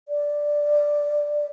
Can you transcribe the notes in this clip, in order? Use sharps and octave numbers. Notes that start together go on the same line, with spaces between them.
D5